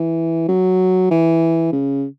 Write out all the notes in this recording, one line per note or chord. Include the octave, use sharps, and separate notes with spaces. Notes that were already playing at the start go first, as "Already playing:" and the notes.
Already playing: E3
F#3
E3
C#3